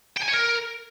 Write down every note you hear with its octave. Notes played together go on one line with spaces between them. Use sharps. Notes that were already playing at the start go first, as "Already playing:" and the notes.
G5
G#5
C#5
A#4